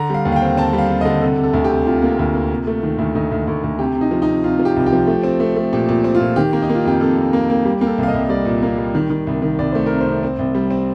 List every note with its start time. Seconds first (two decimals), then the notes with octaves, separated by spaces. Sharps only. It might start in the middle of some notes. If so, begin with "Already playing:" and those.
Already playing: D3 A#5
0.10 G3 F5
0.25 D#2
0.32 F5
0.36 G5
0.42 C4
0.57 C4 A5
0.73 G3
0.78 F5
0.90 G3
1.01 D3 D#5
1.21 C3 A4
1.38 C3
1.43 A4
1.53 D2
1.64 G4
1.71 C3
1.86 C3 F4
2.02 A#3
2.19 D2
2.34 A#3
2.51 C3
2.67 A3
2.83 D#3
2.98 D2
3.15 D2 D#4
3.32 D2
3.47 D2
3.63 D2
3.79 C3 G4
3.95 C3
4.01 D#4
4.11 F3
4.22 D#4
4.28 C3
4.44 C3 F4
4.59 F3
4.65 G4
4.76 C2
4.86 G4
4.93 F3
5.07 A3
5.23 C4
5.40 A3
5.56 A3
5.73 A#2 G4
5.89 A#2
6.04 C4
6.15 F4
6.20 A#2
6.36 D#3 G4
6.53 A#3
6.62 D#4
6.69 A#3
6.75 F4
6.85 F2 G4
7.01 F2 A4
7.18 F2
7.33 A#3
7.50 A#3
7.65 G3 G4
7.81 A#3 G4
7.87 A4
7.98 C2
8.03 F5
8.08 D#5
8.13 C2
8.29 G3 D5
8.45 A#2
8.63 A#3
8.77 G3
8.95 D#3
9.10 D#3
9.27 C2
9.42 D#3
9.59 C2 D5
9.72 A3 C5
9.86 C3 A#4
10.01 C5
10.06 C2
10.23 C4
10.39 C2
10.55 G3
10.70 C4